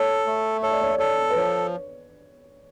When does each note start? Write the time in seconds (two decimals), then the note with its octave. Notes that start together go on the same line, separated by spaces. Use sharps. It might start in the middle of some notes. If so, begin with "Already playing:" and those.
Already playing: A4 C#5
0.26 A3
0.63 A4 C#5
0.71 D5
0.81 C#5
0.90 D5
0.98 A4 C#5
1.30 B4
1.36 F3 C#5